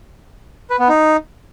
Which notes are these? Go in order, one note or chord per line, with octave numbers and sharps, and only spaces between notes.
B4
B3
D#4